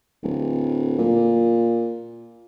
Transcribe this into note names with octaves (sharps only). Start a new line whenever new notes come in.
D1
A#2